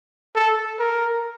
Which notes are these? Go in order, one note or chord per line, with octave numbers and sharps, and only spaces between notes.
A4
A#4